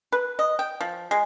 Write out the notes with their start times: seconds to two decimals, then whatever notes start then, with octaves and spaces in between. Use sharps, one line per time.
0.12 B4
0.39 D#5
0.59 G5
0.81 F3
1.11 G#3